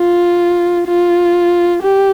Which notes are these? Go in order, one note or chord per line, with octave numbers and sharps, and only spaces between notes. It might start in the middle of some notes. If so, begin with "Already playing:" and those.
Already playing: F4
F4
G4